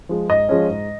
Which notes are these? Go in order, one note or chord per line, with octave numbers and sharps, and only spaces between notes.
F3 G#3
G#2 D#5
F3 G#3 C#4
G#2